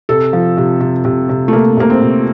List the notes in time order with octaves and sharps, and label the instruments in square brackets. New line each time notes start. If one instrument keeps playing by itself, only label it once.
[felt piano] C3 A4
F3
C3
C3
C3
C3
A3
C3 A#3
C3 A#3
C4
C3